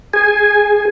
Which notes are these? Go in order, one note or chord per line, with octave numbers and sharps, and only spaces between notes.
G#4 G#5